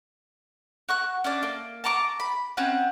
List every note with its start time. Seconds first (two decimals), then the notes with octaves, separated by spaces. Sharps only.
0.89 F#4 C#6 F#6
1.24 C#4 D4 D5
1.43 A#3
1.84 A5 A#5 C#6 D6
2.20 B5
2.57 C4 C#4 F#4 F#5